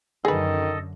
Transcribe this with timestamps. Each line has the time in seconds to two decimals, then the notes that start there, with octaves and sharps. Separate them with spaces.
0.25 F#2 D3 D#3 G#4 A4 B4 D#5